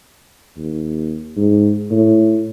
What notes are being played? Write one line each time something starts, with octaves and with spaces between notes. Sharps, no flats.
D#2
G#2
A2